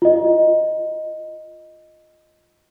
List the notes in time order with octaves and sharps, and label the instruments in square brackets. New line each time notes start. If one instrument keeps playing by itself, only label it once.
[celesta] F4 D#5